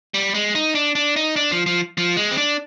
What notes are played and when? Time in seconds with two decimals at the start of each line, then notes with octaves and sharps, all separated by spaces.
0.14 G3
0.34 G#3
0.55 D#4
0.75 D4
0.95 D4
1.16 D#4
1.36 D4
1.52 F3
1.66 F3
1.98 F3
2.17 G#3
2.31 C4
2.38 D4